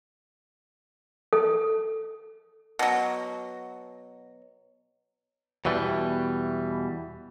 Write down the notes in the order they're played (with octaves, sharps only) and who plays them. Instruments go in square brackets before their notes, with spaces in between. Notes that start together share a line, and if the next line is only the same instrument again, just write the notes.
[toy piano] A4
[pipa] B2 F#3
[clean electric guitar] E2 B2 E3 G3